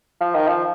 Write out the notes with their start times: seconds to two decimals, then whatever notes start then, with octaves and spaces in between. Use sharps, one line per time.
0.21 F3
0.34 D#3
0.47 F3